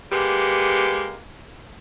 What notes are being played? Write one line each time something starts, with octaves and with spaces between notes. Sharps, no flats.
G#3 A#3 B3 G4